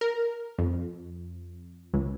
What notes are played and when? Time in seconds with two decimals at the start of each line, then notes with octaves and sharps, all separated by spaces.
0.01 A#4
0.59 F2
1.94 C#2